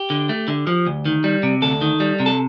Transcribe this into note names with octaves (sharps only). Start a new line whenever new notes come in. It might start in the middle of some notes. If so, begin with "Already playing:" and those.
Already playing: G4
D3
A3
D3
F3
D2
D#3
G3
C3
D2 A4
D#3
G3
C3
A4